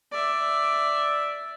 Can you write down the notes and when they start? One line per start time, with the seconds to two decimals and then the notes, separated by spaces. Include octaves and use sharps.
0.12 D5 E5